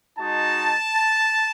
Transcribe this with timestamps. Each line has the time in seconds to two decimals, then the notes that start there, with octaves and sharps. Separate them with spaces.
0.18 G#3 D#4 F#4 A5